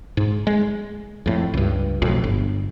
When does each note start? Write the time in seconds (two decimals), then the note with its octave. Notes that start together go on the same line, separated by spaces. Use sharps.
0.17 G#2
0.47 G#3
1.26 F2 A2
1.54 C#2 G2
2.02 B1 F2 A2
2.24 G1